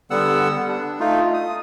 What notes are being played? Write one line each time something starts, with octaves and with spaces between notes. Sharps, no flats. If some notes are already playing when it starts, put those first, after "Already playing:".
D3 G3 B3 F#5 E6
D4
A3 D#4 F4
D#6